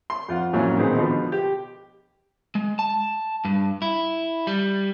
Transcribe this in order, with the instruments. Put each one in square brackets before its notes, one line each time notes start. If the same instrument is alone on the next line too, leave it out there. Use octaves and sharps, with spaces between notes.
[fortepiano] C6
F2 F4 F#5
A1 F2 F#3 A#3 C#4 G#5
A#2 D#3 G#3 B3 C4
B2 D3 F3 B3
G4
[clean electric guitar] G#3
A5
G2
E4
G3